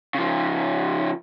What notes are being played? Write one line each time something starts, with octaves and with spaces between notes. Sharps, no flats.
C#3 F3